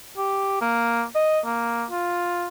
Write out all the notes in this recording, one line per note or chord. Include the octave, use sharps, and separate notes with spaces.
G4
A#3
D#5
A#3
F4